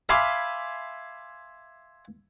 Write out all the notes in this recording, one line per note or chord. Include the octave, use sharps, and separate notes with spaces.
E5 F5 G#5 B5 C6 D6